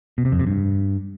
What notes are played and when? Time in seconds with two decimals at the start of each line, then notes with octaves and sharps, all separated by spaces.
0.18 B2
0.25 C3
0.32 F2
0.39 C3
0.47 G2